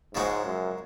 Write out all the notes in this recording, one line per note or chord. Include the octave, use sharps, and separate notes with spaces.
G#2 C#3 F3 G#3 D#4 F#4
F#2